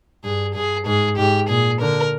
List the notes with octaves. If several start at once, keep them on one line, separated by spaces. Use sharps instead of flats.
G2 G#4
G2 G#4
G#2 G#4
G#2 G4
A#2 G#4
D3 A#4